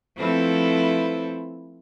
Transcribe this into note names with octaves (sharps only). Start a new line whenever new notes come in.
F3 A3 C4 E4 A4 B4